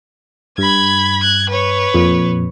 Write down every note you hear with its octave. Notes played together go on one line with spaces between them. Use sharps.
G2 B5 G#6
F#6 G#6
B4 C#5
F2 A#2